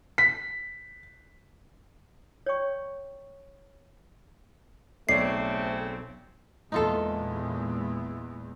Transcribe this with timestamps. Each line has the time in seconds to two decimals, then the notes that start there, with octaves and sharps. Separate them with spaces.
0.18 B6
2.46 C#5 D5 G5 C#6
5.09 B1 C#3 A3 C4 C#5 D5 C7
6.72 E2 A#2 G#3 D#4 F4 A4